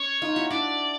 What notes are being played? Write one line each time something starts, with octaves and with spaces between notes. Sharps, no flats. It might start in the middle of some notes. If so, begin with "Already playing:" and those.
Already playing: C#4 C#5
D#4 F4
E4 F#4
D4 E4 D5